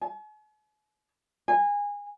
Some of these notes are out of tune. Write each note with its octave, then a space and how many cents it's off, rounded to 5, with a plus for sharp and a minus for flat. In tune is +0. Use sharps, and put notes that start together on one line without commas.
G#5 +45
G#5 -25